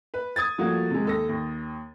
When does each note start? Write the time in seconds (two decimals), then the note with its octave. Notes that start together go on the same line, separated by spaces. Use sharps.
0.14 B4
0.36 D#6 G#6 A6
0.58 F3 G3 A3 A#3 F#4
0.91 C3 G#3
1.05 D#2 A4 A#6
1.29 D#2